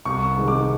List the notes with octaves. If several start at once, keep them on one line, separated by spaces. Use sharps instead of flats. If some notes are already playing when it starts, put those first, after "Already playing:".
C2 C#6
C3 D#3 G#3
D6